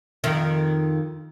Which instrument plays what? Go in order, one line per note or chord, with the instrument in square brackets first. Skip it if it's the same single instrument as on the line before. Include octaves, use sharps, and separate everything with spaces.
[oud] F2 D#3